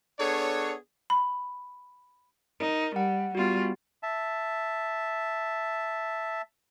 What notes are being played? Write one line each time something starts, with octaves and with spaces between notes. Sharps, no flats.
B3 D4 G#4 A4 C#5
B5
D#4 A#4
G3 F#5
G3 B3 F4 F#4
E5 A5